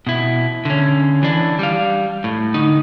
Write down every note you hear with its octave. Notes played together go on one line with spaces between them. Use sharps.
B2 E4
D3 C#4
E3 D4
G3 F5
A2
D3 D#4